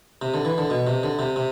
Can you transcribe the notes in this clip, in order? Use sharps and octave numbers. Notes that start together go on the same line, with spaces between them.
C3
D3
E3
D3
B2
C3
D3
C3
C3